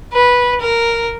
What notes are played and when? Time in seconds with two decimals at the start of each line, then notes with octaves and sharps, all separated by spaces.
0.13 B4
0.61 A#4